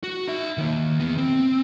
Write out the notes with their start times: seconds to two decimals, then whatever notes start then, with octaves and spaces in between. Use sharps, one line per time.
0.03 F#4
0.28 D#4 E5
0.58 D#3 A#3
1.00 E2 B3
1.18 C4